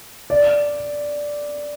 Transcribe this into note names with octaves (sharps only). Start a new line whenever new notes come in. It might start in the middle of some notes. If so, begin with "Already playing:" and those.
D5